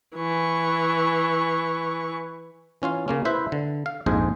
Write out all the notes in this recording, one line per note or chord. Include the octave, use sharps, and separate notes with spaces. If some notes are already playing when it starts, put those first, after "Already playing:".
E3 C#6
E3 C#4 F4 F5
C#3 A#3 C#4
E4 B4 C5 E5
D3
F5
A#1 F2 G#2 G#4 C5